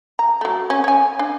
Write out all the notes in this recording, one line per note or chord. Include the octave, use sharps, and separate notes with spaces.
A#5
F#3 A3
C#4
C#5 G#5
D4